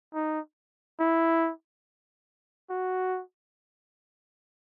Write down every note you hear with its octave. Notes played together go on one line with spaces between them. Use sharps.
D#4
E4
F#4